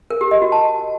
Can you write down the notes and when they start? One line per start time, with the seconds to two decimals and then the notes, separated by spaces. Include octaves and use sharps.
0.10 A#4
0.21 G4
0.31 D#5
0.42 F#4
0.52 A5